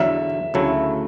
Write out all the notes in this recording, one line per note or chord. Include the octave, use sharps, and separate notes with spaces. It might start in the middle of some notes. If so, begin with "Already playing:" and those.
Already playing: E2 D3 F#3 E5
D2 C#3 F#3 A3 E4